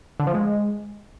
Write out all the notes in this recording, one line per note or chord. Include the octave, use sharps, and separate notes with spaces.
D3
F3
G#3